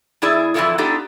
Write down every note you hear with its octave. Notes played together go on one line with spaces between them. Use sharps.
E2 E3 E4 G#4 D5
F2 E3 E4 F4 A4 D5
B3 D4 D#4 F4 G4 A4